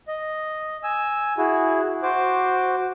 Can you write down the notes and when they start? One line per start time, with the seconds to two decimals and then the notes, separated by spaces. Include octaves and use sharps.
0.08 D#5
0.83 G#5 E6
1.38 E4 F#4 G#4
2.03 F#4 C5 D6